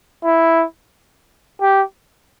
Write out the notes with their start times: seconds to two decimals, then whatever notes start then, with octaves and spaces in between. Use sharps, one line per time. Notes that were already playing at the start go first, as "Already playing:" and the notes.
0.24 E4
1.61 G4